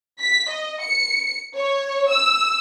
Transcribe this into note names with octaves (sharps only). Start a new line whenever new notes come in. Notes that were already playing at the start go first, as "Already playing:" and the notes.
B6
D#5
C#7
C#5
E6